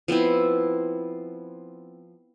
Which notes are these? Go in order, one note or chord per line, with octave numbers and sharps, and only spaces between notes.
F3 B3 C4 E4